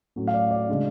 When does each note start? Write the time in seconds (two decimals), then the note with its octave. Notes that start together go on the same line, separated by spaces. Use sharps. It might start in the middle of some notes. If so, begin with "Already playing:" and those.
0.16 A2 F#3 A3 C#4
0.27 F5
0.34 D5
0.51 D5
0.69 C#3 G#3 D4